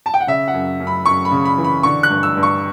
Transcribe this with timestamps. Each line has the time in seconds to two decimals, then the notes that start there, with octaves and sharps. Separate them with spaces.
0.06 A5
0.14 G5
0.20 F#5
0.27 C#3 E5
0.48 F#5
0.54 F#2
0.80 F#2
0.87 B5
1.06 F#2 C#6
1.25 B5
1.31 C#3
1.45 B5
1.58 E3
1.64 B5
1.83 D3 C#6
2.03 F#6
2.10 G2
2.23 E6
2.37 G2
2.43 C#6